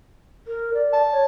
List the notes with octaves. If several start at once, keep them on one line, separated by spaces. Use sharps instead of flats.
A#4
D5
A5
C#5